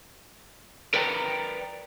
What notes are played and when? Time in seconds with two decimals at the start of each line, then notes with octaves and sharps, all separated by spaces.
0.94 A#4 B4 D5 G5 G#5 A#5